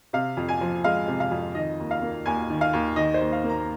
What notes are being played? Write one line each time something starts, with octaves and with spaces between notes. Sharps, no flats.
C3 F5
F2
G#5
F3
G#3 F5
C3
F5
F2
D#3 D#5
D#2
F5
A#3
D#2 G#5
D#3
F5
D#2
D#3 D#5
C5
D#2
F5
A#3
A#5